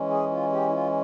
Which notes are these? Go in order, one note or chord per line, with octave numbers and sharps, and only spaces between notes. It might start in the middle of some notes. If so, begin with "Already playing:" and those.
Already playing: E3 G#3 C#4
G#4
F4
G4
E4
F4